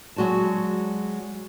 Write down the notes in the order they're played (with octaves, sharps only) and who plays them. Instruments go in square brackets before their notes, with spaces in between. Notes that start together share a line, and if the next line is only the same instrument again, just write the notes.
[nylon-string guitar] F#3 G#3 F#4 D5 A5